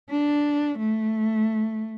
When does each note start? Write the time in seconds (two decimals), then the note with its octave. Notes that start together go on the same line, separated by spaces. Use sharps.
0.10 D4
0.78 A3